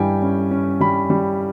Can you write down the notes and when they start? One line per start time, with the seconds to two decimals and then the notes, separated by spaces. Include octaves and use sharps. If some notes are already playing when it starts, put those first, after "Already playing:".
Already playing: G2 G3 E4 G5 G#5
0.22 C#4
0.51 C#4
0.80 G3 B5
1.10 G3